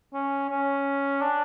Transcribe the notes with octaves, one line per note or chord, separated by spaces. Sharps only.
C#4
C#4
D4